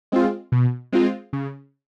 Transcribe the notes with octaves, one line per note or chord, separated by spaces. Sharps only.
G#3 C4 F4
B2
G#3 C4 F4
C#3